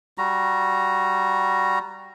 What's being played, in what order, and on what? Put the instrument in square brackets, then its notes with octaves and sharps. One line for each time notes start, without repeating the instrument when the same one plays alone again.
[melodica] G3 F#4 A#5